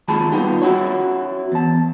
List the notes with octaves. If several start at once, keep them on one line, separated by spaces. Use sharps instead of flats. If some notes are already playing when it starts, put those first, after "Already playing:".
D#2 G#3 F4 A5 B5
G3 B3 D#4 F4 G4
C#4 E4 F#4 C#5
E2 A5